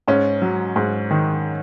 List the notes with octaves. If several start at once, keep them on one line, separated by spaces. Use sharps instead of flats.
G#2 C#4
F#3
G#2
D#3